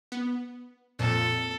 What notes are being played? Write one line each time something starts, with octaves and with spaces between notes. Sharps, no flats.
B3
F2 A#2 A4